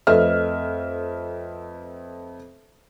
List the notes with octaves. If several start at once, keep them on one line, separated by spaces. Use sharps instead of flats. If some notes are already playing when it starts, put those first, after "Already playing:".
F2 A3 B4 D#5 E5 F6